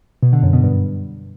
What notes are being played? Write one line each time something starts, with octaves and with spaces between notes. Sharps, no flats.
B2
D3
F#2
B2
G2